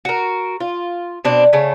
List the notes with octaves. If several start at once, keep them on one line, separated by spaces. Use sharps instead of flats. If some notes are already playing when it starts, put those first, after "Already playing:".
F#4 A#4
F4
B2 C4 D4
C#3 A3